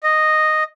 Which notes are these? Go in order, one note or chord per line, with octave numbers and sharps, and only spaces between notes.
D#5